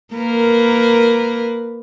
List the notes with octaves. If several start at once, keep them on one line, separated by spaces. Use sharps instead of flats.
A#3 A#4 B4